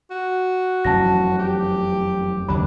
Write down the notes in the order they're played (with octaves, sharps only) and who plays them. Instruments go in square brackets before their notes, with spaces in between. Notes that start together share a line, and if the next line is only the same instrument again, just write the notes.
[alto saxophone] F#4
[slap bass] F1 F#2 E3 [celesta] A5 A#6
[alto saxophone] G4
[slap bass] F#1 D#2 F#3 [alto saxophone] D4 [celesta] B5